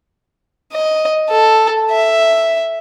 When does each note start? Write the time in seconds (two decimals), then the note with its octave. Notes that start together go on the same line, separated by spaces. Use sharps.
0.73 D#5
1.29 A4
1.92 E5